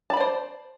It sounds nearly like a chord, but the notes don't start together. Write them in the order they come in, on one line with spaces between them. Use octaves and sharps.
A5 B5 D5 C5